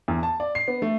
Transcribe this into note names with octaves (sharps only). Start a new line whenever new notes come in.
E2
A5
D5
C7
B3
A3